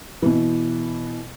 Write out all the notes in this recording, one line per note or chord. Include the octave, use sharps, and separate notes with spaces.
B2 E3